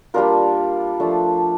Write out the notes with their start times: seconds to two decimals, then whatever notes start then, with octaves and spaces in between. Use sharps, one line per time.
0.14 G3 A#3 D4 F4 A#4
1.00 F3 A3 D4